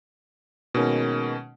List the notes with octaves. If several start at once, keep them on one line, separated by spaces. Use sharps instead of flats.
B2 D#3 G#3 A#3 C#4